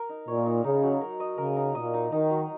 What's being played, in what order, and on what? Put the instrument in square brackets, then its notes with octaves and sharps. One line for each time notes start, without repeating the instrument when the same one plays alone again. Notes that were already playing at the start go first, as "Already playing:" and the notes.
Already playing: [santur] A#4
D#4
[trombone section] A#2 [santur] C#5
[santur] D#4
[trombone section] C#3 [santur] D#4
[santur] F#3
A#4
D#5
[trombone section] C#3 [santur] A#4
[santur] D#4
[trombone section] A#2 [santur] D#5
[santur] D#4
[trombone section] D#3 [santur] D#4
[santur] F#3